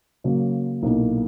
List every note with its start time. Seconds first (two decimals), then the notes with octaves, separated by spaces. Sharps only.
0.24 C#3 F#3 A#3
0.83 B1 A#2 A#3 E4